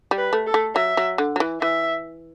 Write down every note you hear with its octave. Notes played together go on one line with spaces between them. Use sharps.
G3
B4
A3
A4
A3
F#3 E5
F#3
D3
F#3
E3
E3 E5